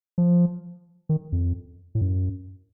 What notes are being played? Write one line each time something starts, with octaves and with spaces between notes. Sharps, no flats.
F3
D#3
F2
A2
F#2